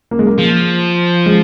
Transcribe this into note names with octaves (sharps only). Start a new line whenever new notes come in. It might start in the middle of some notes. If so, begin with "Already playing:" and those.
A#3
G#3
A#3
F3
G#3